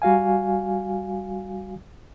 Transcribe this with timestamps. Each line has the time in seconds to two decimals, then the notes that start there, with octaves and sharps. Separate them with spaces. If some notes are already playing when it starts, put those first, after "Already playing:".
0.02 G3 F#4 F5 G#5